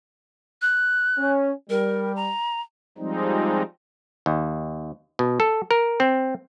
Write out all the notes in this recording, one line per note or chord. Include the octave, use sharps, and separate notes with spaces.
F#6
C#4
G3 A#4
A#5
F3 G3 G#3 C4 D#4
D#2
B2
A4
A#4
C4